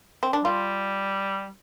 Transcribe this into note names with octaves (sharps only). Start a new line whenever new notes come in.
C4
D4
G3 F4